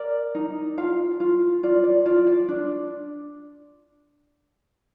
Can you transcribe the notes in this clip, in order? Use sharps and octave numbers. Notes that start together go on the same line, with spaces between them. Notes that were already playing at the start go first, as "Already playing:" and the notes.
Already playing: A#4 D5
D#4
F4 F5
F4
F4 D5
D5
F4 D5
D5
D4